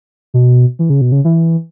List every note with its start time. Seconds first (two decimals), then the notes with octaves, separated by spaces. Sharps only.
0.34 B2
0.79 E3
0.90 C#3
1.01 B2
1.12 C#3
1.25 E3